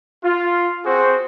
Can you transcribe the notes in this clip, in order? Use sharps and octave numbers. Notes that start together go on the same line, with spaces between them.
F4
C4 F#4 G#4 C5